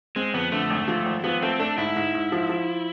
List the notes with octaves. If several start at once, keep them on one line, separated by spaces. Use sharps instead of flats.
G#3 C4
F2 B3
D3 A3
G#1
F3
G#1
F3 B3
A3 C4
A3 D4
G#2 E4
G#2
G#2
F3
F3